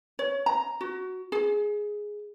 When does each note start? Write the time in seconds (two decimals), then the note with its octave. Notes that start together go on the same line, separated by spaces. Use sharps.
0.19 C#5
0.46 A#5
0.81 F#4
1.32 G#4